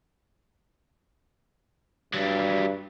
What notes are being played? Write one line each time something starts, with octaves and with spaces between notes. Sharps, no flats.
G2 F#3 G3